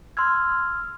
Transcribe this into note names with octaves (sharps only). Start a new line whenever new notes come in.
C6 E6 F6 G#6